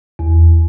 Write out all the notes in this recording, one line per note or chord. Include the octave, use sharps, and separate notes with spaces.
E2